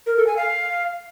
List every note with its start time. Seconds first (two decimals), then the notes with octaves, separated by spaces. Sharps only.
0.06 A#4
0.16 A4
0.26 G#5
0.37 F5